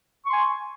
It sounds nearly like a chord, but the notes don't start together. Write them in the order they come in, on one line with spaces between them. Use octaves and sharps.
C#6 C6 G#5